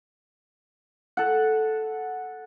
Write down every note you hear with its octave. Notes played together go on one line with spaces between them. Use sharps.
A4 F#5